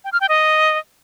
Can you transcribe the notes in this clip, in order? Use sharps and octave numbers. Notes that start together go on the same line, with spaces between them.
G5
F6
G5
D#5